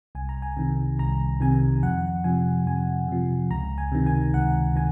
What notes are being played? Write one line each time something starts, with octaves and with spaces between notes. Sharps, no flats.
C2 G#5
A#5
G#5
C3 D#3
C2 A#5
C3 D#3 G#5
F2 F#5
C3 F3 G#5
F2 G#5
C3 F3
C#2 A#5
G#5
C3 D#3
G#5
C#2 F#5
D#3 G#5